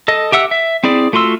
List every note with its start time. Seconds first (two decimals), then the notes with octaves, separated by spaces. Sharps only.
0.08 A4 D#5
0.32 G4 E5 F#5 E6
0.51 E5
0.84 C4 E4 G#4 D5
1.13 A3 F4 F#4 C6 E6